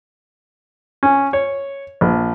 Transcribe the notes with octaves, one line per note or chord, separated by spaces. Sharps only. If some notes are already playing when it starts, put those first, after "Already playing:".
C#4
C#5
A#1